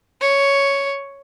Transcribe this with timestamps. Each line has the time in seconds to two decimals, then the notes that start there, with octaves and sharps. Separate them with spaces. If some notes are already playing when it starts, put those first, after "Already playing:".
0.21 C#5